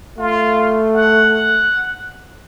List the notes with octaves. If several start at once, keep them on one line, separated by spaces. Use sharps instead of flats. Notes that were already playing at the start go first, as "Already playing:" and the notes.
A3 F4
F#5